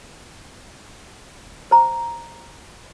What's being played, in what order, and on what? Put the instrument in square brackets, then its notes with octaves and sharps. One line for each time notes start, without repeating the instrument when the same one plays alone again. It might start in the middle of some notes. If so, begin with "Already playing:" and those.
[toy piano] C5 A#5